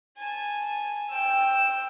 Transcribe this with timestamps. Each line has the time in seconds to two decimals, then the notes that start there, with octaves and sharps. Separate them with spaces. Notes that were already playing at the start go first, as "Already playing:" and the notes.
0.18 G#5 A5
1.10 G5 E6